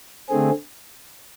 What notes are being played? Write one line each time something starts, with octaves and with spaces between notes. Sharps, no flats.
D3 A3 C4 G#4